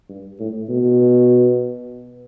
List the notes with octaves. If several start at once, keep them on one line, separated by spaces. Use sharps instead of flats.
G2
A2
B2